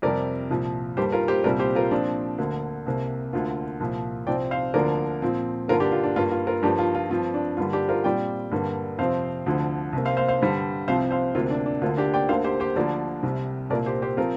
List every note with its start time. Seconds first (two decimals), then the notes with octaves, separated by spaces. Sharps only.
0.02 F2 C3 G3 A#4 D5
0.50 C2 A#2 F3
0.97 G2 G3 A#3 G4 C5
1.12 F4 A#4
1.28 G4 C5
1.44 C2 A#2 G3 C4 A#4 D5
1.60 G4 C5
1.75 F4 A#4
1.91 A#2 F3 C4 D4
2.38 D2 D3 A#3
2.86 C2 C3 A#3
3.33 D2 D3 A#3 F4
3.80 C2 A#2 F3
4.27 C2 C3 F3 C4 D5 G5
4.51 C5 F5
4.74 D2 D3 F3 A#3 A#4 D5
5.22 A#2 F3 C4
5.68 G2 D3 A#3 F4 A#4
5.80 D4 G4
5.92 F4
6.04 D4
6.16 G2 G3 A#3 F4
6.31 F4
6.47 F4 A#4
6.63 G2 F3 A#3 D4 G4
6.79 F4
6.95 F4
7.10 G2 F3 C4 F4
7.34 D4
7.57 G2 D3 G3 A#3 F4
7.73 D4 G4
7.89 F4 A#4
8.04 A#2 G3 C4 D5 G5
8.51 G2 D3 G3 A#3
8.98 F2 C3 F3 C4 C5 F5
9.46 D2 D3 F3
9.93 C2 C3 A#3
10.05 C5 F5
10.17 C5 F5
10.28 C5 F5
10.41 G2 D3 G3
10.88 C2 C3 F3 C4 C5 F5
11.11 C5 F5
11.35 D2 C3 A#3 F4
11.50 D4
11.66 D4
11.81 D2 D3 A#3 F4
11.97 D4 G4
12.14 D5 G5
12.29 D2 D3 A#3 C5 F5
12.44 G4 C5
12.60 G4 C5
12.76 D2 D3 F3 A#3 A#4 D5
13.23 C2 C3 G3
13.70 C2 A#2 A#3 A#4 D5
13.86 G4 C5
14.02 G4 C5
14.17 F3 C4 F4 A#4